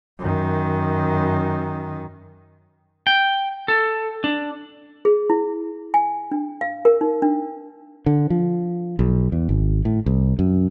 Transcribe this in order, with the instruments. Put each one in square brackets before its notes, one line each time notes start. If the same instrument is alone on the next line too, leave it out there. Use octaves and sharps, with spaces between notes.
[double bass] F#2 D#3
[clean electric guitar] G5
A4
D4
[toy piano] G#4
E4
G#5
D4
F5
A#4
D#4
D4
[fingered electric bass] D3
F3
B1
E2
G#1
A2
C2
F#2